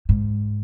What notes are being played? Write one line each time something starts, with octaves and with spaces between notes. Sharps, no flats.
G#2